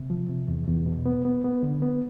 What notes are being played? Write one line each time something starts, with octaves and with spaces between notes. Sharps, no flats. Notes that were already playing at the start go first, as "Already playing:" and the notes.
Already playing: C3
F3
C3
E2
E2
B2
B3
B3
B3
D3
B3